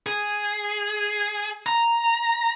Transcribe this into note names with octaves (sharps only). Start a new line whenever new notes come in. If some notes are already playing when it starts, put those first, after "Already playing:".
G#4
A#5